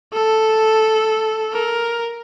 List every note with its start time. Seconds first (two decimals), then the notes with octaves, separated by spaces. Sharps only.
0.14 A4
1.53 A#4